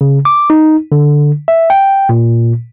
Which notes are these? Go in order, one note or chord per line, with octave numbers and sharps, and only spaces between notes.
C#3
D6
D#4
D3
E5
G5
A#2